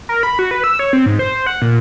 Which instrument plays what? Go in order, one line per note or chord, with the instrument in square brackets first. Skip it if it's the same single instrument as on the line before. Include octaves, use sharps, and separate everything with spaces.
[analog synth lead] A#4
B5
F#4
B4
E6
C#5
C4
G#2
C5
C5
F#5
A#2